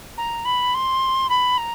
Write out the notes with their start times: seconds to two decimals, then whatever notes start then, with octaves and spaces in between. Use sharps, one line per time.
0.18 A#5
0.45 B5
0.74 C6
1.30 B5
1.58 A#5